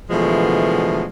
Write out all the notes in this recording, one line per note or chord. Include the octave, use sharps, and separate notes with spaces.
B2 D3 E3 F3 G#3 A3